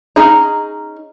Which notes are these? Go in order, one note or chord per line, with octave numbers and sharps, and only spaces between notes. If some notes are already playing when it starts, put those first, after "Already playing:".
C#4 D#4 G#4 D#5 A#5